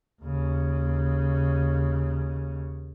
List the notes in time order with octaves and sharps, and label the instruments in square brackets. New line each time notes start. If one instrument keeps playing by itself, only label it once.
[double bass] D#2 C#3